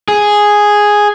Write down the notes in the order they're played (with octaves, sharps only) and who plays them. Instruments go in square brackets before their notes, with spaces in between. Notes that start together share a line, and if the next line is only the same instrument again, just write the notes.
[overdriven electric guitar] G#4